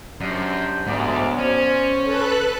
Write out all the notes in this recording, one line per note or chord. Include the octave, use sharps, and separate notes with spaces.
F#2 D4 G4 C5
D2 G#2 F#3 B3 D5
C#4 C5
A4 B4 F#6